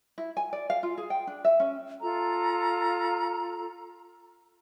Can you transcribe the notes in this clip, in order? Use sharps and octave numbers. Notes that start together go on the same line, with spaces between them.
E4
G#5
D5
F5
F4
G#4
G5
D4
E5
C#4
F4 A4 A#5